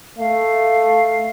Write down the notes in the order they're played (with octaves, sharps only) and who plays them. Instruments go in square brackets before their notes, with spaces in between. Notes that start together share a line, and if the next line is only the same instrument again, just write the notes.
[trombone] A3 [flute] F5